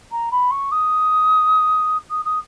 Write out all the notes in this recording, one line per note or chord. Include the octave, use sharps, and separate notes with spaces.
A#5
B5
C#6
D#6
D#6
D#6